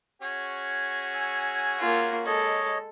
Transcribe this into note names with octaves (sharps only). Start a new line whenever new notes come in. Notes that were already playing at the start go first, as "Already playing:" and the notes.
C#4 F#4 G#4
G#5 E6
A#3 F4
G#3 A4 C#5 D#5